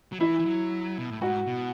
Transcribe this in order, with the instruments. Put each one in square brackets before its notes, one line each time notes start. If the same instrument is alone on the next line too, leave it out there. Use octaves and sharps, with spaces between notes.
[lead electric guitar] F#3
[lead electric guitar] E3 [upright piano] E4
[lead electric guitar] E3
F#3
B2
A2
[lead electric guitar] G#2 [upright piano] F#4
[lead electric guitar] B2